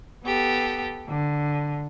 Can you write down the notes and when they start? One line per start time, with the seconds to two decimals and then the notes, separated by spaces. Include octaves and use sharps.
0.24 B3 G4 A4
1.08 D3